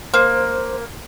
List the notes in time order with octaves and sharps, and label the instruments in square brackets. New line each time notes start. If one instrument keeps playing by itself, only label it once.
[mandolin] A#3 [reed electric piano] C5